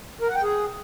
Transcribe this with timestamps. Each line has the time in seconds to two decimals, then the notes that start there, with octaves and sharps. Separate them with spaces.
0.21 A#4
0.28 F#5
0.36 G5
0.43 G#4